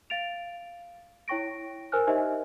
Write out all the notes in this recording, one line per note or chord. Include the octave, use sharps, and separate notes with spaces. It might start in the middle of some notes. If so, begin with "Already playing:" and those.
F5 A6 D7 F7
E4 C#5 G5 C#6 A#6 D7
A#4 C5 G#5 F6 F#6
D#4 G4 C5 D#5 E5